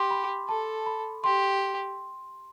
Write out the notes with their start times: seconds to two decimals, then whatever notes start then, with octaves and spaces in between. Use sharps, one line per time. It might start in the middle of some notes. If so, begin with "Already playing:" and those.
Already playing: G4 C6 D6
0.11 B5
0.48 A4 A5
0.86 B5
1.24 G4 C6